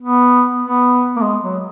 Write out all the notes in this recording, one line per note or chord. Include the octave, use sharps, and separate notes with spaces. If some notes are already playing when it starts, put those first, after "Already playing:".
B3
B3
A#3
G#3
F#3